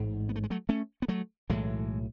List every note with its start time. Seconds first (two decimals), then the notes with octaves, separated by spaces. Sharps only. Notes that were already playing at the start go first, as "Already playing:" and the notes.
Already playing: A1 G#2
0.29 B3
0.36 A3
0.43 G#3
0.50 F#3 A3
0.69 A3 C#4
1.02 B3
1.08 F#3 A3
1.49 B1 A2 E3 G#3